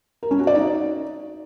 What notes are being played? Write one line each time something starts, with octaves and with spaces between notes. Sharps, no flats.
A#4
C#4
F#4
D5
D#4